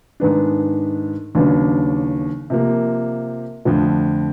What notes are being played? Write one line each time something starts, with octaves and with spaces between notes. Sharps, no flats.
G#2 D#3 G#3 B3 D4
D#2 C#3 F#3 B3 D4
C3 F3 A#3
F2 D3 F3 A3